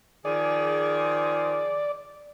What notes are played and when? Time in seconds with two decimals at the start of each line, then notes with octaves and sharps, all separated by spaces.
0.25 D#3 F3 G#4 D5